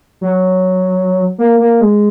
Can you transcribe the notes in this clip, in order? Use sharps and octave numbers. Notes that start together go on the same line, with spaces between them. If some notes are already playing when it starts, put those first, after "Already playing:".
F#3
A#3
A#3
G#3